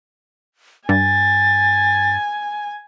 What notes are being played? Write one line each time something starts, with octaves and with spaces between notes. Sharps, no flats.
G2 G#5 A6